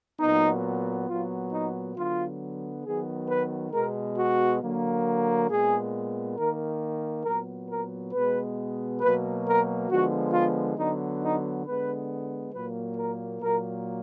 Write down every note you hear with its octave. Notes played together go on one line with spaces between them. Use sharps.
A#2 F#3 B3 D#4
A#2 F#3 B3 F4
D#4
D3 F#3 B3 F4
D#3 F#3 B3 G#4
B4
B2 G#3 B3 A#4
F#4
D3 F#3 A#3
A#2 G#3 B3 G#4
D#3 A#3 A#4
A#2 F#3 B3 A#4
A#4
B2 G#3 B3 B4
B2 F#3 A#3 B4
A#4
D3 F3 G#3 B3 F#4
F4
D3 F#3 B3 D#4
D#4
D3 G#3 B3 B4
A#2 F#3 A#3 B4
A#4
A#2 F#3 A#3 A#4